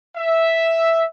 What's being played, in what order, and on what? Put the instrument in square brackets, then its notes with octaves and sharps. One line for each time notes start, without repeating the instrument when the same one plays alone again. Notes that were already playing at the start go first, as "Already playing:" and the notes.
[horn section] E5